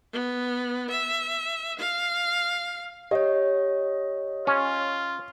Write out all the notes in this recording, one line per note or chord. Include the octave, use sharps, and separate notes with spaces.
B3
E5
F5
G4 C#5 D#5
C#4 F4